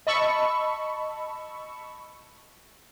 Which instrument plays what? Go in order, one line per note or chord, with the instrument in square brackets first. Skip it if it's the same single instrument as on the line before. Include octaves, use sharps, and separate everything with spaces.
[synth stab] D#5 A5 B5 C#6 E6